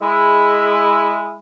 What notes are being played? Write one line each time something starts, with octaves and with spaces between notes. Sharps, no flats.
G#3 E4